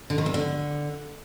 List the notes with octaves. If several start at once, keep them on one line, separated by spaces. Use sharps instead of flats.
D3
D#3
E2
D3